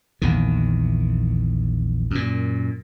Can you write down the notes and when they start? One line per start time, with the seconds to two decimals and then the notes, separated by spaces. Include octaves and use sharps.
0.22 A#1 E2 D#3
2.11 F#2 A#2